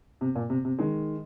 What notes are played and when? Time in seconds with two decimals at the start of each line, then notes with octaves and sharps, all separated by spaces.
0.21 C3
0.35 A#2
0.50 C3
0.65 C3
0.79 D#3 G#3